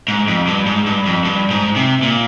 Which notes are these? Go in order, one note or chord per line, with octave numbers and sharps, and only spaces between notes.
G#2
F2
G2
G#2
G2
F2
G2
G#2
C3
A#2